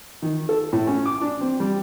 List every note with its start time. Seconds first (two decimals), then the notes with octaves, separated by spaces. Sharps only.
0.22 D#3
0.49 A4
0.73 A2
0.87 C#4
1.06 D6
1.21 D4
1.41 C4
1.60 G3